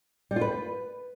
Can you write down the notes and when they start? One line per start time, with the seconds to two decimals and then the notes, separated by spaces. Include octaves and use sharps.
0.31 G3
0.36 F4
0.41 B4